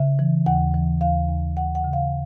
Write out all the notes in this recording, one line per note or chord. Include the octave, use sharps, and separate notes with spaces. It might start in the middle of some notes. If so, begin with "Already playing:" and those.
Already playing: C#3 E5
E3
D#2 F#5
E3
D#2 F5
D#2
D#2 F#5
F#5
C#3
F5